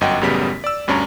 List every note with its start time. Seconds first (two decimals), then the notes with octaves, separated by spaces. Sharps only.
0.01 G1 F#2 D#5 F#5 G5
0.21 A1 F#2 C#3 G3 B3 B6
0.64 D5 E6
0.88 D2 G2 C#4 D4 C#5 A#5